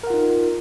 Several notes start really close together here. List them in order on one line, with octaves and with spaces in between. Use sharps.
A#4 F#5 F4 D#4